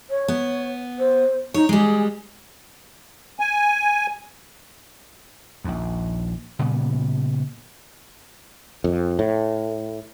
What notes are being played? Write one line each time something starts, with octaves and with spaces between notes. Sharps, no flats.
C#5
B3
C5
D#4 C#5
G3 G#3 G#4
G#5
A#1 D#2
A#2 C#3 G3 B3
F2
A2